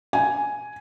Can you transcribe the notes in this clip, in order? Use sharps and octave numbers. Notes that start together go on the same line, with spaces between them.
G#5